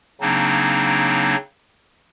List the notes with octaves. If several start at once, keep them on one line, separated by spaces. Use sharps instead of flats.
C#3 F#3 A#3 C4 D4 D#4